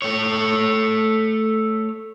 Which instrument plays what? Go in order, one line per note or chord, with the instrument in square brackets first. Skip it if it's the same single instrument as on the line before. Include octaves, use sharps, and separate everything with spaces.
[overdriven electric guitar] A3 C#5